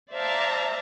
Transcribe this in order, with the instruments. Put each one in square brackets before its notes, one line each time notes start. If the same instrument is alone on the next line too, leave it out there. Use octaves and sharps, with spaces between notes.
[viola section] C5 D5 E5 F5 A5 A#5